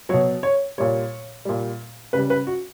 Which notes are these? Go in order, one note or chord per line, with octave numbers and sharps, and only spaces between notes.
B2 F#3 C#5
C#5
A#2 G3 C#5
A#2 G3
C#3 G3 B4
B4
F#4